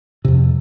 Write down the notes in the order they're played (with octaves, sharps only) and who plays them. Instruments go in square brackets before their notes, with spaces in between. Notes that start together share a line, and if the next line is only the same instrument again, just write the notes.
[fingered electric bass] F2 C3